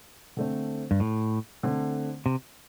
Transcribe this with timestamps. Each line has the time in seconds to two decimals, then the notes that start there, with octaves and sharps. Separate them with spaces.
0.37 D3 A3 C4
0.91 G2
1.00 A2
1.63 D3 A3 C4
2.26 C3